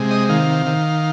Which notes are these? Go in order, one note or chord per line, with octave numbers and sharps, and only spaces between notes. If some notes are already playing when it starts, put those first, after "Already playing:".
Already playing: C3 G#3
D#5
D#3 F5
D#3